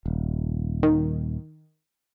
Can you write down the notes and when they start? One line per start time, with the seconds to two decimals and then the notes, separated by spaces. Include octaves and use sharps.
0.06 D#1
0.83 D#3